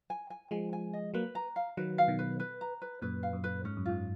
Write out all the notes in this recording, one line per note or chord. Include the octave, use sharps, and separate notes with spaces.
G#5
G#5
F3 G#3 G#5
G#5
D#5
F#3 A#3 B4
A#5
F5
D#3 F#3 B4
F5
B2 D#3
B4
B4
A#5
B4
F#2 A#2 B4
F5
F#2
B4
G#2 C#4
F#2
G#2 F4